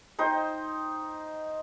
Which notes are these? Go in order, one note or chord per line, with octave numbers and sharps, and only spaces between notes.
D#4 C5 G5